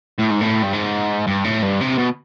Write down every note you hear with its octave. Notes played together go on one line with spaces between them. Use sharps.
A2
G#2
A2
G2
G#2
G2
A2
G2
C3
B2